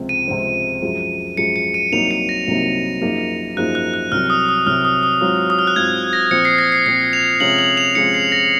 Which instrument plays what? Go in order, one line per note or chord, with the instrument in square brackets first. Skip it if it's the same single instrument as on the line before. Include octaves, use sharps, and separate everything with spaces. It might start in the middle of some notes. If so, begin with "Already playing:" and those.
Already playing: [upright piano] C#2 C3 F3 C4
[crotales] D#7
[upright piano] C#2 C3 F3 C4
F#2 F3 G#3
[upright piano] F#2 F3 G#3 [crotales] C#7
[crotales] C#7
D#7
[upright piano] C2 C3 F#3 A#3 D#4 [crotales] F7
[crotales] C#7
A#6
[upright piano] C2 C3 F#3 A#3 D#4
F#2 F3 A#3 D#4 G#4
[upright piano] F#2 F3 A#3 D#4 G#4 [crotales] F#6
[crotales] F#6
F#6
[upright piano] C2 C3 F#3 [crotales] F6
[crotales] D#6
D#6
[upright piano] C2 C3 F#3 [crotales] F6
[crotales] D#6
D#6
[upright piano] G#2 F#3 C4 F4
[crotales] D#6
F6
F#6
[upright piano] G#2 F#3 C4 F4 [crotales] G#6
[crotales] A#6
[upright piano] A#2 F3 C4 [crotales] C#7
[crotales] C7
A#6
C7
[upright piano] A#2 F3 C4 [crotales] C7
[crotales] F7
[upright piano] C3 F3 G#3 C#4 F4 [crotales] F#7
[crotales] F#7
F7
[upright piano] C3 F3 G#3 C#4 F4 [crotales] C#7
[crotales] C7
A#6